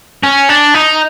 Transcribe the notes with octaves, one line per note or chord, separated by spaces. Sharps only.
C#4
D4
D#4